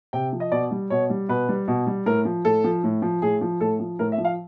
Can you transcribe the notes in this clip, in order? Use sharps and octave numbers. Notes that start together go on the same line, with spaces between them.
C3 G5
F3
D#5
B2 D5
G3
B2 C#5
G3
B2 B4
G3
B2
G3
A2 A#4
F3
A2 A4
F3
A2
F3
A2 G#4
F3
A2 A4
F3
A2 A#4
E5
F3
F5